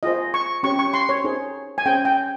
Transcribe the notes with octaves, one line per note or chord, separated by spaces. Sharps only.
F4 G#4 C5 D#5
C#6
C#4 G4 C#5 C#6
C#6
C6
C#5
D#4 G#4 C5
G#5
C#4 G#4 C5 G5
G5